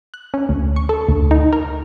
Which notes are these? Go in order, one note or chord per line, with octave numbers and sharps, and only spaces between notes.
F#6
C#4
D2
C#6
A4
D2
D#4
A#4